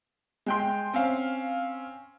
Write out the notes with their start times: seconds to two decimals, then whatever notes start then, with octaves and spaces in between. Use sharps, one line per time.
0.46 G#3 G5 C6
0.94 C4 C#4 F5